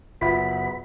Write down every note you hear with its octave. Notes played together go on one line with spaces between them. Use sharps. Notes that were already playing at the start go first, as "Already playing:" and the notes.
F#1 B3 F4 B4 E5 B5